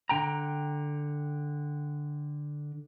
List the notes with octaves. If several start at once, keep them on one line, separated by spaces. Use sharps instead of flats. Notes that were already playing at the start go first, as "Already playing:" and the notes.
D3 G5 A#5